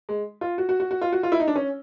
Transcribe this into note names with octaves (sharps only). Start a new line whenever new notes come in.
G#3
F4
F#4
F#4
F#4
F#4
F4
F#4
F4
E4
D#4
D4
C#4